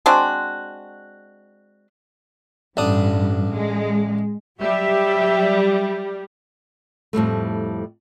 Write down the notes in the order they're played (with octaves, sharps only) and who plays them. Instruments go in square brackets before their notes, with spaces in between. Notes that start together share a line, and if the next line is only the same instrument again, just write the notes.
[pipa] G#3 C4 D4 F#4
[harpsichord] A1 D4 D#6 [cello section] G2
[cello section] G#3
[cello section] F#3 G4 E5 [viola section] G3
[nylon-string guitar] F2 A2 G3 A3